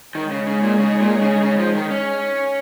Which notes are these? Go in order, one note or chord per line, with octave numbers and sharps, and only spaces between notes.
D#3 G#3 D#4 G#4 C#5
C#3
C#3
A#2
C#3
A#2
C#3
C#3
F3
D#3
C#4